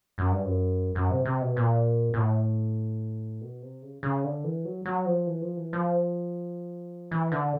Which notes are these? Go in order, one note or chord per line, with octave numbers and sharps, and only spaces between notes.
F#2
G2
F#2
F#2
C3
C3
B2
A#2
A#2
A2
B2
C3
C#3
C#3
D3
E3
F#3
F#3
F3
E3
F3
E3
F3
E3
D3